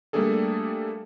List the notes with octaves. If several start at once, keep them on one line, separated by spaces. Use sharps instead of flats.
G3 A3 A#3 D4 G#4 A4